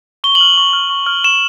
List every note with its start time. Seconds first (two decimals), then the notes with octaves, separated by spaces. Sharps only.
0.24 C#6 G7
0.35 F#7
0.41 F6
0.58 C#6
0.73 F6
0.90 C#6
1.07 F6
1.24 C#6 E7